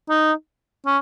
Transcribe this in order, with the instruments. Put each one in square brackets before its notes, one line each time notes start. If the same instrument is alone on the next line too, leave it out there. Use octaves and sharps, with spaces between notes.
[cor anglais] D#4
C#4